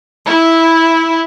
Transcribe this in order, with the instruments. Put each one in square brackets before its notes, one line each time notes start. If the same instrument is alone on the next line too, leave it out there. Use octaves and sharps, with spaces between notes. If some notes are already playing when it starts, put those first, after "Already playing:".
[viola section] E4